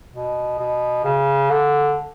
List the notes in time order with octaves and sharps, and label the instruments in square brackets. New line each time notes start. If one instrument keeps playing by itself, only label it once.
[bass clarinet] B2
B2
C#3
D3